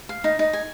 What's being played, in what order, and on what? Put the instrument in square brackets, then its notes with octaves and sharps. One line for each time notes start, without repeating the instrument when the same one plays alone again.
[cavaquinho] F5
D#4
D#4
G#5